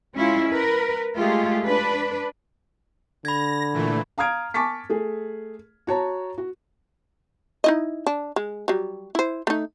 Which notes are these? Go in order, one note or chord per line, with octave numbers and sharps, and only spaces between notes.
G#3 C#4 E4 F4
A#4 B4
G#3 A3 F4 G4 G#4
D4 B4
D3 B5 G#6 A#6
A#2 E3 A3
F5 A#5 D#6 F6 G#6 D7
G#5 A5 C#6 D6 A6 B6
A3 G#4
F#4 C#5 A5 A#5
F#4
D#4 E4 D#5
D4
G#3
F#3 G3
E4 C5
A3 D#4